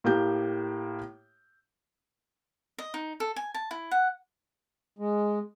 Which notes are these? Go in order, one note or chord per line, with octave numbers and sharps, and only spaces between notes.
A2 A#3 G4 G6
D#5
D#4
A4
G#5
A5
E4
F#5
G#3